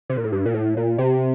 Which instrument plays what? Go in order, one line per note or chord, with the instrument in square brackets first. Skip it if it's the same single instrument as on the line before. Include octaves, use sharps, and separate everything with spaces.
[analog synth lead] C3
A#2
A2
G2
A#2
A2
A#2
C3